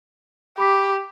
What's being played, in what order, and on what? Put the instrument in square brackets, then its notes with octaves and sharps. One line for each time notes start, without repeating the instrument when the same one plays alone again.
[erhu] G4 [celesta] B5 D6 B6